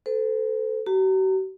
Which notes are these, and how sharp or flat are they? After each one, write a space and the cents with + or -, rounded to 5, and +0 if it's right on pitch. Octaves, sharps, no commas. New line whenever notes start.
A4 +0 C5 -45
F#4 +45 A#5 -30